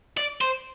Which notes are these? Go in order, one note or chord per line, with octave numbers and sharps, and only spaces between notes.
D5
C5